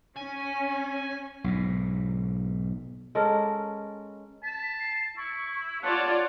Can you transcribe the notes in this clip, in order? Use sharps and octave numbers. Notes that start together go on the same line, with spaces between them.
C#4 G#5
B1 G#2
G#3 C#4 A4 A#4
A5 B6
C7
E4 C#6
F4 C#5 D5 F#5 A5